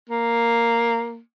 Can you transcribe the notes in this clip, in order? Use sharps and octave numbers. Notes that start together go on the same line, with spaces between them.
A#3